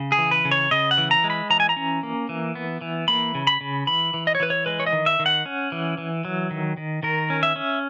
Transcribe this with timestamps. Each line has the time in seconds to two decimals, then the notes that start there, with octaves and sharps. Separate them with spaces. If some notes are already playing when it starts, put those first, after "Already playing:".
Already playing: C#3
0.12 G#4
0.18 E3
0.31 B4
0.45 C#3
0.51 C#5
0.71 C#3 D#5
0.91 F#5
0.98 E3
1.11 A#5
1.24 G#3
1.30 B5
1.50 E3 A#5
1.60 G#5
1.69 A#5
1.76 C#4
2.03 A#3
2.29 E3
2.55 B3
2.81 E3
3.08 A#3 B5
3.35 C#3
3.47 B5
3.61 C#3
3.87 E3 B5
4.14 E3
4.27 D#5
4.35 C#5
4.40 E3 B4
4.50 C#5
4.66 G#3 B4
4.80 C#5
4.86 D#5
4.93 D#3
5.06 E5
5.19 D#3
5.26 F#5
5.46 C#4
5.72 E3
5.98 E3
6.25 F#3
6.51 D#3
6.77 D#3
7.03 D#3 A#4
7.30 C#4
7.43 E5
7.56 C#4